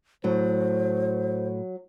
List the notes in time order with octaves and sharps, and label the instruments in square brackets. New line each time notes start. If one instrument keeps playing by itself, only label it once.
[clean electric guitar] A2 [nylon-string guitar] F#3 [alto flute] C5